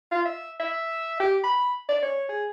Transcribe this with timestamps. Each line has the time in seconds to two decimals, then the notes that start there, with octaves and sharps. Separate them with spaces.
0.12 F4
0.25 E5
0.60 E5
1.20 G4
1.44 B5
1.89 D5
2.02 C#5
2.29 G#4